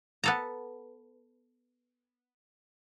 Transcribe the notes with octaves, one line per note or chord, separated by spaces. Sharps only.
B3 A4 A#5